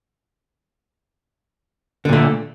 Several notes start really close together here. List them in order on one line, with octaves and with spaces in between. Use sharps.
D3 A#2 A3